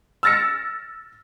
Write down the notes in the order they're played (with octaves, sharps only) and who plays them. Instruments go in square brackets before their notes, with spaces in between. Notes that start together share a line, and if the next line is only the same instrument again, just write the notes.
[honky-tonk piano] E6 F6 A6 A#6 C#7